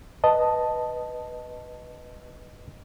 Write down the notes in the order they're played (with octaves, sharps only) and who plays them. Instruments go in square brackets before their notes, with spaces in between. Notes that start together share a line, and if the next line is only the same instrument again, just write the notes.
[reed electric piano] B4 D#5 A5